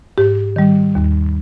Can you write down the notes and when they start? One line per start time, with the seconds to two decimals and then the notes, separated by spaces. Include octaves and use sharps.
0.18 G#2 G4
0.56 D#3 G3
0.95 D#2